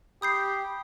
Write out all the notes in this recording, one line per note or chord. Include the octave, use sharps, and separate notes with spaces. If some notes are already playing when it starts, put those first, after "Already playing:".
G4 B5 D#6 G6 C7